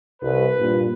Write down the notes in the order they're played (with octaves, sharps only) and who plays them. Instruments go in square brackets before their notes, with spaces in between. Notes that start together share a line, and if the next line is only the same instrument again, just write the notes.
[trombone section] C2 [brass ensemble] B4
[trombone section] G2 A#2